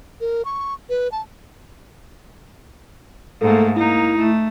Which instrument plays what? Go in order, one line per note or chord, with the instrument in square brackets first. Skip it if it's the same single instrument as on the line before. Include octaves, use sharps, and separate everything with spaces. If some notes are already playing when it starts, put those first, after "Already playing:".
[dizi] A#4
C#6
B4
A5
[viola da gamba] G#2 A3 A#3 [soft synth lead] A4
[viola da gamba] A#3 D#4 [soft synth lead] E4
[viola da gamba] A3